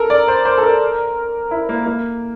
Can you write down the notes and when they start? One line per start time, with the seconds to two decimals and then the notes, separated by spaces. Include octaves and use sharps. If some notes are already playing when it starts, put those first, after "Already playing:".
Already playing: A4 A#4
0.10 D5
0.28 C5
0.45 C5
0.58 A4
0.63 A#4
1.51 E4
1.69 A#3
1.87 A#3